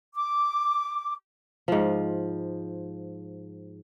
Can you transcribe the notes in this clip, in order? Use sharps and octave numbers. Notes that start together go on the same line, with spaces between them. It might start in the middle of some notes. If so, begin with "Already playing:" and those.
D6
G#2 F3